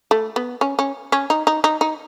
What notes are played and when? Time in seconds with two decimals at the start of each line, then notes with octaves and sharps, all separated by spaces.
0.11 A3
0.36 B3
0.61 C#4
0.79 C#4
1.12 C#4
1.30 D#4
1.47 D#4
1.64 D#4
1.81 D#4